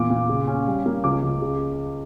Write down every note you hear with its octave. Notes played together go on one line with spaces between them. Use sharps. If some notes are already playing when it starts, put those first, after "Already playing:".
Already playing: E2 A#2 D6
A#2
C#3
C#4
G3
A#3
C#2 D6
C#2
C#3